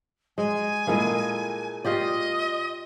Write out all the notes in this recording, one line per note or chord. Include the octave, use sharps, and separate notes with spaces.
G#3 G#5
A#2 G#3 A#3 E4 G#4 A4
F4 G4 D5 D#5